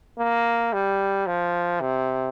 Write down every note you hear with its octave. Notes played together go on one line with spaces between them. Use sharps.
A#3
G3
F3
C3